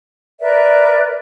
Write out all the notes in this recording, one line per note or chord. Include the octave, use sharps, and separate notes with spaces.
A#4 B4 D5 E5